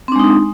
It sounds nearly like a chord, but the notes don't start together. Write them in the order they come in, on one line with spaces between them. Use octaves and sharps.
C4 D4 G#3 D#4